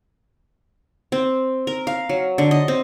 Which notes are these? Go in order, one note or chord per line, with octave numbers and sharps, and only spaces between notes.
C4
A#4
F5
F#3
D3
D#5
C4